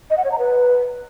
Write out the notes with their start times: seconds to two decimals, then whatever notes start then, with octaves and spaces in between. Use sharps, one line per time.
0.10 D#5
0.17 F#5
0.24 C#5
0.31 A#5
0.39 B4